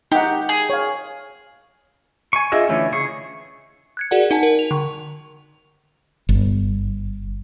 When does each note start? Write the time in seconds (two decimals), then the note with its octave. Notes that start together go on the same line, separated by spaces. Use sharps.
0.12 D#4 G4 F#5
0.49 G#4
0.70 C#5 F5
2.33 G#5 C#6
2.52 D4 F4 G#4 D#5 E5
2.69 D3 E3 A3 C#4
2.92 C#3 G#4 C#6
3.97 F#6 G#6 C#7
4.11 F#4 G#4 A#4 D5 F#5
4.31 D#4 F#5 G#5 A5
4.43 A#4
4.59 F7
4.71 D3 C#6
6.29 G1